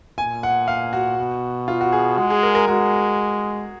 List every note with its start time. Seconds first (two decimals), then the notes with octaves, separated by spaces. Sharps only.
0.18 A#2 G#5
0.43 F#5
0.68 F5
0.93 F#4
1.18 B2
1.68 F4
1.81 F#4
1.92 G#4
2.18 G#3 F#4
2.30 G#4
2.43 A#4
2.55 A#4
2.68 G#3 F#4